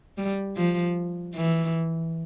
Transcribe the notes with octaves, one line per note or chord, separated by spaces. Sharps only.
G3
F3
E3